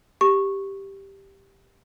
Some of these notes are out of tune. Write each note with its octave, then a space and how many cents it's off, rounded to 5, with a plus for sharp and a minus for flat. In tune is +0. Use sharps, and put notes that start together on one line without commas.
G4 +0 C#6 -10